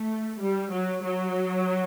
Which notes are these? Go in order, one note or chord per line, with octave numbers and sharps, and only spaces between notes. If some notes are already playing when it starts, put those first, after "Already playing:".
Already playing: A3
G3
F#3
F#3